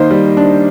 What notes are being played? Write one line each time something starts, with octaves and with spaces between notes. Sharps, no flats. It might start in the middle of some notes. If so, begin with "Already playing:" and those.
Already playing: D#3 A#3 C5 D#5
G3
D4